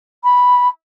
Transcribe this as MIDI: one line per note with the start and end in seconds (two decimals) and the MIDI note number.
0.23 0.67 83